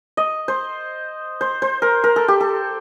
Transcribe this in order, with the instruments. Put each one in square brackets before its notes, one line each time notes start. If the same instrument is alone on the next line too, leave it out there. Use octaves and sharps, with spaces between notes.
[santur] D#5
C5
C5
C5
A#4
A#4
A4
G4
A4